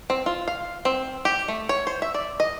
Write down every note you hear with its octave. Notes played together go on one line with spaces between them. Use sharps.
C4
F4
F5
C4
G4
A3
C#5
C5
E5
D5
D#5